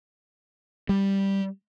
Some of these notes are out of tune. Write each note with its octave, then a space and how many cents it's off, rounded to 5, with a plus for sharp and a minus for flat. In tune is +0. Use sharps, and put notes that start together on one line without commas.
G3 +0